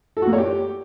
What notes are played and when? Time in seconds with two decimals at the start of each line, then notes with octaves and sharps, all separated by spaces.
0.17 A4
0.22 F#4
0.27 A#3
0.33 C#5
0.38 G4